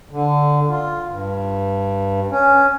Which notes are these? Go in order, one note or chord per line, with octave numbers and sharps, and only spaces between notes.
D3
F4
G2
C#4